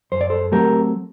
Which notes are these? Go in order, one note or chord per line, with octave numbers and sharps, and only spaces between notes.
F#2 C5
D5
A4 C5
F#3 A3 C4 G4 A#4